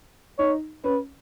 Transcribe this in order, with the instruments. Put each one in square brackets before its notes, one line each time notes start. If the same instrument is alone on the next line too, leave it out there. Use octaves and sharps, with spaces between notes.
[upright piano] D#4 [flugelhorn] C#5
[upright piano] C#4 [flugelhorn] B4